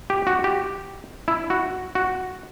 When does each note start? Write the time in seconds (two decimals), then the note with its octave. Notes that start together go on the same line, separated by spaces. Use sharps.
0.10 G4
0.27 F#4
0.44 G4
1.28 E4
1.50 F#4
1.95 F#4